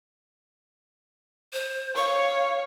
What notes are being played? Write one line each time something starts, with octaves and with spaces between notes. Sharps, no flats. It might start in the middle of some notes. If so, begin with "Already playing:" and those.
C5
C#5 F5 C#6